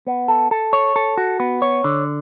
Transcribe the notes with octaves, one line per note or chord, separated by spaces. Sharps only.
B3
A4
A4
C#5
A4
F#4
B3
C#5
D3